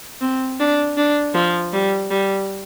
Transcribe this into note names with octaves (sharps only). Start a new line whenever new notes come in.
C4
D4
D4
F3
G3
G3